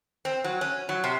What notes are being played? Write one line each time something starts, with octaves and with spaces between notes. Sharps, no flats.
C4
F#3
C#4
F#3
C3